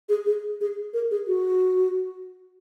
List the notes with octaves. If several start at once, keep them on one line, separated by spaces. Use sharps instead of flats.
G#4
G#4
G#4
A#4
G#4
F#4